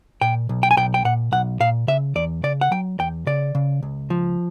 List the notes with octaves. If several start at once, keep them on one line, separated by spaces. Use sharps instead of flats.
A#2 G5
B1
G5
G#5
B1 G5
G5
A#2 F#5
B1 F#5
A#2 F5
C#3 E5
E2 D5
C#3 D5
F#5
F#3 G5
E2 G5
C#3 D5
C#3
C#2
F3